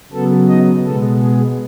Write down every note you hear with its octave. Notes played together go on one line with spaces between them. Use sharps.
C#3 F#3 B3 A4
D#4 D#5
B2 G#3 B3 A4
G#4